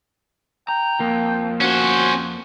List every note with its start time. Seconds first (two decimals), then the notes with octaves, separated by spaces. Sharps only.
0.69 G5 A#5
1.00 F2 A#3
1.61 C#4 F#4 C5